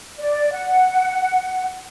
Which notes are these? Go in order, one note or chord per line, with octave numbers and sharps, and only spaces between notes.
D5
F#5